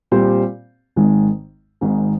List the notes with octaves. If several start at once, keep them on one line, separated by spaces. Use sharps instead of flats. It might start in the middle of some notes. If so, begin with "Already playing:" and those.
A#2 G3 C4 G4 C5
G#1 G#2 D#3 G#3
G#1 G#2 D#3 G#3